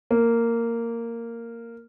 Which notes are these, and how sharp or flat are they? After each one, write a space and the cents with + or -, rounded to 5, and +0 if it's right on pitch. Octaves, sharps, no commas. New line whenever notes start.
A#3 -10